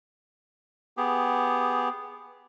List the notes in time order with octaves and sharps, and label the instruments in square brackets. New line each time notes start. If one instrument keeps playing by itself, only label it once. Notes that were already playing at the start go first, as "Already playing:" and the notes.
[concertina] B3 G4 G#4